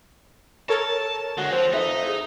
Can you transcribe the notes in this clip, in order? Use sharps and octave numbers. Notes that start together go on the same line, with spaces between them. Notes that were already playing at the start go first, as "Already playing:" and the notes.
A4 A#4 C#5 A5
D3 G#3 F#4
F3 C4
F2 D#4 B4 E5 F5
E4 G#4